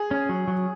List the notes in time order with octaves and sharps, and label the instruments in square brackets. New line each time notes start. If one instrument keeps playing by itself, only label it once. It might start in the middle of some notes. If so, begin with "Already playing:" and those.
Already playing: [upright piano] G#4
[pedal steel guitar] C#4
F#3
F#3